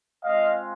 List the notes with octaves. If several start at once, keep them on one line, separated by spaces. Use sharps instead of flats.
G#3 C4 F4 D#5 F5